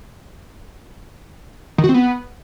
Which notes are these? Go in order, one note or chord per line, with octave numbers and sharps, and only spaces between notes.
D#3
F#4
C4
B3